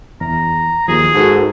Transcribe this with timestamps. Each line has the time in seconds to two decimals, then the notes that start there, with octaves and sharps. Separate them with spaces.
0.21 E2 A#5
0.88 D#2 F3 G#4
1.15 G#2 F#4 A4 A#4